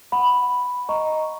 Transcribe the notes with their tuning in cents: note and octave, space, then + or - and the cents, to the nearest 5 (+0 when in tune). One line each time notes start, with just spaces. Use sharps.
F#5 -10 B5 +0
D#5 +0 A#5 +0 C#6 +0